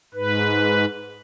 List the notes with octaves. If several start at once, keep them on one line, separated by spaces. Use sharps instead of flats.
G#2 B4